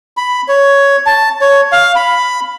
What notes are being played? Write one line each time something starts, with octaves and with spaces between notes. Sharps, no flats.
B5
C#5
A5
C#5
F5
B5